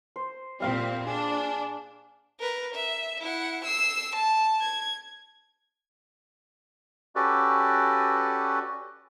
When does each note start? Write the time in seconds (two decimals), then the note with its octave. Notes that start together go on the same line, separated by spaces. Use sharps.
0.16 C5
0.60 A#2 G3 C4 F5 C6
1.07 D4 G#4
2.40 A#4 B4
2.75 E5
3.21 E4 F#5
3.65 E6 C7
4.15 A5
4.61 G#6
7.16 C#4 F#4 G4 A4 B4 D5